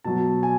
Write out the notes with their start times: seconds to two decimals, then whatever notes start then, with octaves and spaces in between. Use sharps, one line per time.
0.04 B2 F#3 A5
0.43 G#5